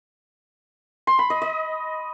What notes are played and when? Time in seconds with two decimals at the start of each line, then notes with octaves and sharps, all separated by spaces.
1.07 C6
1.19 B5
1.30 D#5
1.42 D#5